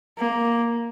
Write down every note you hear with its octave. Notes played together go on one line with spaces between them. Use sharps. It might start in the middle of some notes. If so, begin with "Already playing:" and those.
A#3